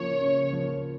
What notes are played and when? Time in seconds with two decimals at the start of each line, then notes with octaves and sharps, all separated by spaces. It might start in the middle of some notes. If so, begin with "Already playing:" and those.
Already playing: C#3 F3 A#3 C#5
0.21 C#3
0.53 F3 A#3